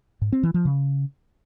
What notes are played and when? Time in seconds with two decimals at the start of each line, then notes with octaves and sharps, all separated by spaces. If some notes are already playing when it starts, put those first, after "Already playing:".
0.22 G#2
0.32 C4
0.43 E3
0.54 F3
0.65 C#3